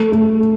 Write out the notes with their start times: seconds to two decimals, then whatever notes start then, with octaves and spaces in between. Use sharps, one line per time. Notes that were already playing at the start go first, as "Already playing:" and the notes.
Already playing: A3
0.12 A3